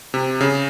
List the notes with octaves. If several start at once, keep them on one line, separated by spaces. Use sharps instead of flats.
C3
C#3